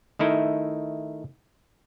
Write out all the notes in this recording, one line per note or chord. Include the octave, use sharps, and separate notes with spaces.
D#3 A3 D#4 E4